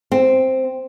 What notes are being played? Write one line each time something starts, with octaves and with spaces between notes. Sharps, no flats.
C4